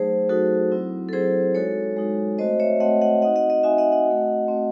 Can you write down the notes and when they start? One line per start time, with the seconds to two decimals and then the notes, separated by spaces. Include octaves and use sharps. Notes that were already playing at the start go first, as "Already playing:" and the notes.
Already playing: F#3 A3 D#4 G#4 C5
0.29 F#3 A3 D#4 F#4 A4
0.71 F#3 C4 E4
1.09 A4
1.13 F#3 C4 E4 G#4 C5
1.55 G#3 D#4 F#4 A4 C#5
1.96 G#3 D#4 F#4
2.38 A3 C4 F#4 C5 D#5
2.60 C#5 E5
2.80 A3 C4 F#4 D#5 F#5
3.01 D#5 F#5
3.22 C4 D#4 F#4 D#5 F#5
3.36 D#5 F#5
3.50 D#5 F#5
3.63 C4 D#4 F#4 E5 G#5
3.78 D#5 F#5
3.92 D#5 F#5
4.06 A3 C4 F#4
4.48 A3 C4 F#4